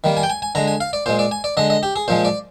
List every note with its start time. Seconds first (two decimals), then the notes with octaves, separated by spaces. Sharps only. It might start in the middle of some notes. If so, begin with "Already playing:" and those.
0.04 D#3 G3 A#3
0.17 G#5
0.23 G5
0.29 G#5
0.42 G#5
0.55 D3 G#3 A#5
0.67 G#5
0.80 F5
0.93 D5
1.06 A#2 G#3 C5
1.19 D5
1.31 G#5
1.44 D5
1.57 D3 G#3 D#5
1.70 D#5
1.83 G4
1.96 G#4
2.08 A#2 F3 G#3 C5
2.25 D5